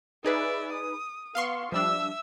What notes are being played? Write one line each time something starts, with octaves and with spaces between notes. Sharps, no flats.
D#4 G#4 B4 D5 E5
D#6
B3 F5 C6 C#6
F3 G3 D4 E5 E6